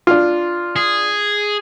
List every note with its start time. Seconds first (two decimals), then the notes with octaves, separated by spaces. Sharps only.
0.07 D4 F4
0.76 G#4